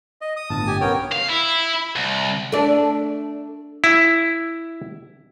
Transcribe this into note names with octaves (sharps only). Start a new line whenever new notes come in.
D#5
D#6
G1 A2 A5
G4 G#5
B1 B3 C#4 A#4 C#5 G5
F5
E4
C2
A3 D4
E4